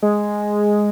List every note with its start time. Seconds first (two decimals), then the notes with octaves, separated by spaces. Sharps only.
0.02 G#3